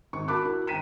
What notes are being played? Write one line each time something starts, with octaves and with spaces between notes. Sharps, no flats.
G#1 C#6
F#4 A#4 A5 B5 D6 F#6
E4 F#4 A#4
G#1 G5 A#5 B6 D#7 E7